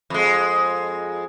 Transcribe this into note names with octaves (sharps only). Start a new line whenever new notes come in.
F2 G#3